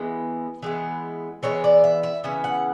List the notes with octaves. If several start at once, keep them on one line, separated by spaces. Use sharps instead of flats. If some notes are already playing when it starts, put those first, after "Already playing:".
Already playing: E3 G#3 B3
E3 G#3 B3
E3 G#3 B3 C#5
D5
E5
E5
C#3 E3 B3 E5
F#5